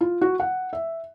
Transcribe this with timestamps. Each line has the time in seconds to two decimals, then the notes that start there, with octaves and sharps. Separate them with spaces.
0.01 F4
0.21 F#4
0.40 F#5
0.73 E5